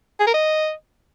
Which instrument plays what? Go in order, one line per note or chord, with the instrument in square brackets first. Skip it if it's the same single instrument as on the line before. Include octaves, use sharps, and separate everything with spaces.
[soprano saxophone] G#4
A#4
D#5